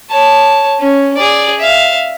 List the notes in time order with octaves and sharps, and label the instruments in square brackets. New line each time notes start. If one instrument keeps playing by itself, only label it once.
[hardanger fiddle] C#5 A5
C#4
G#4 D5
E5 F5